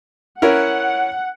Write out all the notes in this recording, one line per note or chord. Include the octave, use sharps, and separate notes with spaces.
C#4 E4 A#4 F#5